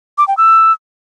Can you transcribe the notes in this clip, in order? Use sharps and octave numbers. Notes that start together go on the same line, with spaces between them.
D6
G5
E6